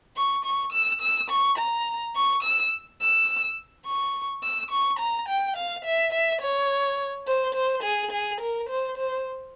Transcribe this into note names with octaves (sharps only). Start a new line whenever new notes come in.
C#6
C#6
E6
E6
C#6
A#5
C#6
E6
E6
C#6
E6
C#6
A#5
G5
F5
E5
E5
C#5
C5
C5
G#4
G#4
A#4
C5
C5